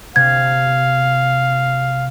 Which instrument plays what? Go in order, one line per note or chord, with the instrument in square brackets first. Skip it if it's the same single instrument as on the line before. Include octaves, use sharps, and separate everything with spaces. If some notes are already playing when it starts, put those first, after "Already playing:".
[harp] C3 [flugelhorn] F5 [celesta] G#6